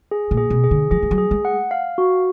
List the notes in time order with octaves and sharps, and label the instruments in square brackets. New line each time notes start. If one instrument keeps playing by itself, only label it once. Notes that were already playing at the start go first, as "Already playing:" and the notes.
[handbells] G#4
[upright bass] A#2
[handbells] G#4
[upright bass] B2
[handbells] G#4
[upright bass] D3
[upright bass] F3 [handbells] G#4
[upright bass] F3
F#3
[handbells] G#4
[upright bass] G#3
[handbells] F#5
F5
F#4